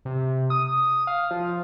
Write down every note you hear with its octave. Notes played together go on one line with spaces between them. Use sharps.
C3
D#6
F5
F3